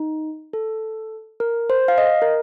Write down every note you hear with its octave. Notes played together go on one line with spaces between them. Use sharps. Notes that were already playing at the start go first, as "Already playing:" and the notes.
Already playing: D#4
A4
A#4
C5
F5
D#5
A#4